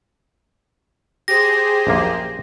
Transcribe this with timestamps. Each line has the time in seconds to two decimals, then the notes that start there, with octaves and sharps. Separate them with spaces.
1.28 G4 G#4 C5 A#6
1.87 A#1 F#2 A#3